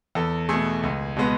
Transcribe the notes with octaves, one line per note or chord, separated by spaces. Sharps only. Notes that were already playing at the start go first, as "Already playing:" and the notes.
E2 A4
B2 A3 G#4
C#2
B2 G#3 B3